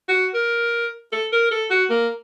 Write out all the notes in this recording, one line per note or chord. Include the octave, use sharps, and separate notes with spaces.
F#4
A#4
A4
A#4
A4
F#4
A#3